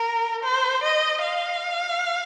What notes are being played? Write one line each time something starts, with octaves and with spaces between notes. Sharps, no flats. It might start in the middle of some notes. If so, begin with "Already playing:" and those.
Already playing: A#4
C5
D#5
F5